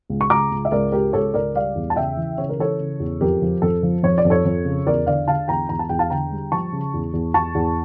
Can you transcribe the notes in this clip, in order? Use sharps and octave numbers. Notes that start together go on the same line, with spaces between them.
C#2
C#6
C#2 A#5 D6
C#2
E5
C#2 A#4 D5
C#2 G4 A#4
C#2 A4 C#5
C#2 A#4 D5
G3 D5 F5
E2
A5
C#3 E5 G5
E3
C#3 C#5
A#4
E3 A4 C#5
C#3
E2
F2 G4 A#4
F3
F2 A4
F3
F2 C#5
D5
F2
A4 C#5
F2
C#3
E2 A#4 D5
D3 D5 F5
D3 F5 A5
E2 G5 A#5
E2 A#5
A5
E2 G5
F5 A5
D3 G5 A#5
G3
F3 A5 C#6
C#3
E2
E2
E2 A5 C#6
E2